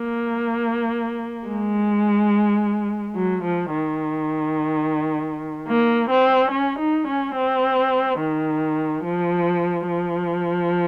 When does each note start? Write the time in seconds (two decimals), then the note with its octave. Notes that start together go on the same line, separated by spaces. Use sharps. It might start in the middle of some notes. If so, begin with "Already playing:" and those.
Already playing: A#3
1.47 G#3
3.15 F#3
3.44 F3
3.72 D#3
5.67 A#3
6.10 C4
6.51 C#4
6.79 D#4
7.08 C#4
7.35 C4
8.20 D#3
9.04 F3
9.87 F3